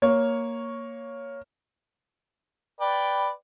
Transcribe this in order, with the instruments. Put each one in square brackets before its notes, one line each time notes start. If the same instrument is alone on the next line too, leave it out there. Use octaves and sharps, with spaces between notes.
[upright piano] A#3 C#5
[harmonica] B4 D5 G5